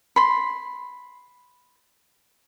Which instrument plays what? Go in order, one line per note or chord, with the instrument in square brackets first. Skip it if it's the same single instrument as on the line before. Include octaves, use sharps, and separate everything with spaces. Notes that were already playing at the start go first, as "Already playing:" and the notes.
[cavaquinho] B5 C6